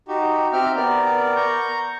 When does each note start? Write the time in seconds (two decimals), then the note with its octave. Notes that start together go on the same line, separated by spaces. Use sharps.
0.08 D#4 F#4 G4
0.53 C4 G4 E5 G5 F6
0.76 B3 A#4 D5
1.36 A#5 C#6 G6